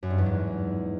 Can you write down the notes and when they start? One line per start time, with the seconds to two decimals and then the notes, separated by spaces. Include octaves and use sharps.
0.03 F#2
0.10 G2
0.18 E2
0.26 G#2